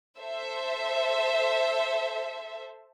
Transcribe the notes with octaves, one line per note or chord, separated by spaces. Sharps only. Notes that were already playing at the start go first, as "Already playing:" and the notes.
A4 C5 E5